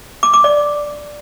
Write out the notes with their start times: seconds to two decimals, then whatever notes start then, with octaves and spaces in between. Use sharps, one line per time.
0.23 D6
0.34 D6
0.44 D5